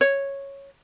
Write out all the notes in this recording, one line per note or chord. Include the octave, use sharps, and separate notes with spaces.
C#5